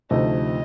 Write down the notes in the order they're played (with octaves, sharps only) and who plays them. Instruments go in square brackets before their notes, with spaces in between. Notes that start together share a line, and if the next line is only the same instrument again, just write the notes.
[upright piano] D2 C3 F3 A3 D#4 [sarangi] D#5